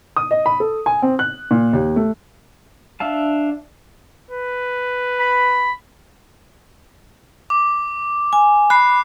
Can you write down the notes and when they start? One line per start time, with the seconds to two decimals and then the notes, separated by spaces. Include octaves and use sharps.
0.16 D#6
0.31 D#5
0.46 B5
0.60 A4
0.86 G#5
1.02 C4
1.19 F#6
1.51 A#2
1.73 D#2
1.96 A3
3.00 D4 E5 F5 A5
4.31 B4
5.20 B5
7.50 D6
8.33 G#5
8.70 B5 F#6 C7